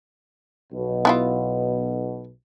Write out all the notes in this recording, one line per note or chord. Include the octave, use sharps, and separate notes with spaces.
B1 B2
B3 E4 F4